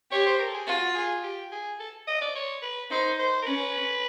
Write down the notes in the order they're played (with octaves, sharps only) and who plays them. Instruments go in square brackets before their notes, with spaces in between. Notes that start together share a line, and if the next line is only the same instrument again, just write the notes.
[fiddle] G4 [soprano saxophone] C#5
[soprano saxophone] C5
A#4
A4
G#4
[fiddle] F4 [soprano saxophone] F#4
[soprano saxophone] G#4
G4
G#4
A4
D#5
D5
C#5
B4
[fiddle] D#4 [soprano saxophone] C5
[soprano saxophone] C5
A#4
[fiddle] C#4 [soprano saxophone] B4